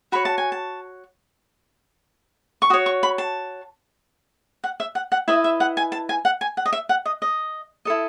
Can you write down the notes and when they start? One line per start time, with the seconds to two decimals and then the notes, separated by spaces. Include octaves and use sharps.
0.12 F#4 C#5 B5
0.25 A5
0.38 G#5
0.52 A5
2.62 C#6
2.70 F#4 D#6
2.74 C#5
2.86 C#6
3.03 B5
3.18 A5
4.64 F#5
4.80 E5
4.95 F#5
5.12 F#5
5.28 E4 B4 D#5 E5
5.44 E5
5.60 F#5
5.77 G#5
5.92 A5
6.09 G#5
6.25 F#5
6.41 G#5
6.57 F#5
6.66 D#5
6.73 E5
6.89 F#5
7.06 D#5
7.22 D#5
7.85 E4 A4 D#5